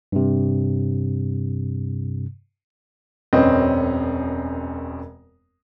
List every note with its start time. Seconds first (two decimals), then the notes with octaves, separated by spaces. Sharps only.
0.12 G2 C3
3.33 E1 F#2 C4 C#4 B4 D#5